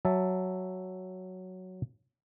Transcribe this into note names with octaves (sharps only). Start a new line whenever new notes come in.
F#3 E5 A5